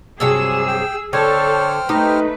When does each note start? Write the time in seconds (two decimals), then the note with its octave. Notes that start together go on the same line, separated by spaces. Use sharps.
0.20 G2 C3 F#3 G#4 E6
0.68 G5
1.13 D3 A4 C5 C#5 G5 F6
1.89 A3 D#4 G4 B4